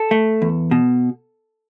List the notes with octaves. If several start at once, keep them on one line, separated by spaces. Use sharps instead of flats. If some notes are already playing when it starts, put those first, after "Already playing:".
Already playing: A4
A3
E2
B2